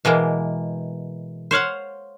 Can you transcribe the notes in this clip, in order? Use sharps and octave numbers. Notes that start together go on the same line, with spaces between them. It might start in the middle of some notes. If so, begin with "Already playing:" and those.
B2 E3 G#3 A#3
C5 C#5 F5 F#5